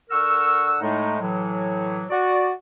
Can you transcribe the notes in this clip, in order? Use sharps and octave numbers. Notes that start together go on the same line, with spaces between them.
D3 A#4 F#5 C#6 E6
A2 G#3 A3 D#4
A2 E3 F#3
F#4 D5